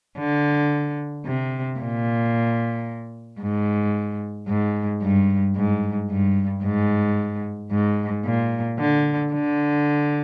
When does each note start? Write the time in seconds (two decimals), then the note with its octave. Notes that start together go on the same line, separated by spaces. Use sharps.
0.18 D3
1.25 C3
1.79 A#2
3.41 G#2
4.48 G#2
5.02 G2
5.56 G#2
6.10 G2
6.63 G#2
7.71 G#2
8.25 A#2
8.79 D3
9.33 D3